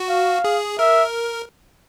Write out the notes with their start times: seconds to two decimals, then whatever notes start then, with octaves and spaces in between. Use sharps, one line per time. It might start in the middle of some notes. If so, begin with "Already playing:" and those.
Already playing: F#4
0.10 F5
0.44 G#4
0.79 A#4 E5